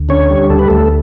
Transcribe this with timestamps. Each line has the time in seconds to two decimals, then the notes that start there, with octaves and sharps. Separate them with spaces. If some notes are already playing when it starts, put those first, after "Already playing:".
Already playing: D2
0.09 D3 C#4 C#5
0.30 G3
0.50 D2 A4
0.59 B4
0.68 D2 A3 A4